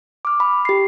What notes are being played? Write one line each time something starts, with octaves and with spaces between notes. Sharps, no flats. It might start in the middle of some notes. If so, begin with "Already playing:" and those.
D6 F6
B5
G4 C7